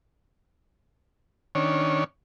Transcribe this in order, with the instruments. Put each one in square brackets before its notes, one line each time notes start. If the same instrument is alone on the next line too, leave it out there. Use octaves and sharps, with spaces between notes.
[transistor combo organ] D#3 C#4 D4 C#5